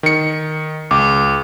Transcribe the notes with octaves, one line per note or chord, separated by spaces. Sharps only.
D#3 C#7
C#2 D6